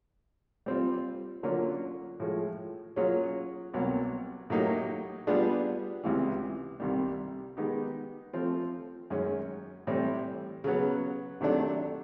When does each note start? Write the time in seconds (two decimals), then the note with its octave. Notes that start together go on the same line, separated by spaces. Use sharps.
0.66 G3 C4 F4
1.43 D3 F#3 A#3 C#4 F4
2.20 A2 F3 G#3
2.96 F#3 A#3 C#4 F4 G#4
3.74 C2 B2 F#3 A#3
4.50 A2 F#3 A#3 D#4 G4
5.27 G3 B3 D4 F4 G#4
6.04 C#2 C3 E3
6.80 C2 C3 D#3 G3
7.57 D#3 G#3 B3 D#4 G4
8.33 F3 A3 C4 F4
9.10 F#2 D#3 G#3 C#4
9.87 A2 E3 G3 C4
10.64 C#3 F#3 B3
11.41 C3 D#3 F#3 A3 D4